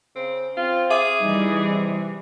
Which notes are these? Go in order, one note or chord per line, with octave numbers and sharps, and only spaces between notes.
C#3 C4
C4 F4
G#4 E5 D6 D#7
E3 G3 D#4
C3